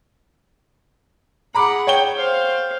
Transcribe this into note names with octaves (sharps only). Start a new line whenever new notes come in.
G#4 F#5 A#5 B5 D6
C#5 G5 G7
C5 F5